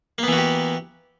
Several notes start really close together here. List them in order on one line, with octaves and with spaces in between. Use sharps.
A#3 B3 E3 F#4 G4